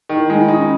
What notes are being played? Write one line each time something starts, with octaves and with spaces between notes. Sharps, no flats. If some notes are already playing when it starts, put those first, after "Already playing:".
D#3
E4
G#3 D#4
E4
D#4
C#4